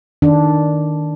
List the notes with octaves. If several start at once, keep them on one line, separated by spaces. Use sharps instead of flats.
D#3 D4